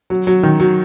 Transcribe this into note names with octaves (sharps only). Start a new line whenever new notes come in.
F#3
F#3
D#3
F#3